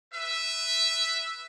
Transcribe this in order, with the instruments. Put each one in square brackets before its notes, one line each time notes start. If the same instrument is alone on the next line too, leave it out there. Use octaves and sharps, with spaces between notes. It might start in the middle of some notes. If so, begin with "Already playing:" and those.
[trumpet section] B4 E5